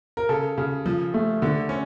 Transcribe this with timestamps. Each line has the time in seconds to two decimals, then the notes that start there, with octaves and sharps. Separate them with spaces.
0.17 A#4
0.29 C#3 A4
0.58 C#3
0.86 F3
1.14 A3
1.42 D3
1.69 C#4